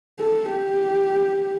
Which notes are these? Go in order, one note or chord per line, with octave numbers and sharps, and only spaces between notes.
A4
G4